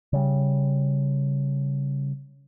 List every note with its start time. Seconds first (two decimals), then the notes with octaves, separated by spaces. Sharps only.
0.13 C#3 G3